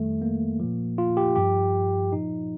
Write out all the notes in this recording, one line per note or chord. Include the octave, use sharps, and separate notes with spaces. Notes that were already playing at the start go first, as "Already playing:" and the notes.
Already playing: F2 D#3 G3 A3
A#3
A#2 F3
F4
G4
G2 F3 G4
A#2 F3 D#4